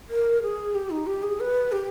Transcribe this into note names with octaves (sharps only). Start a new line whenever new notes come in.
A#4
G#4
G4
D#4
G4
G#4
B4
G4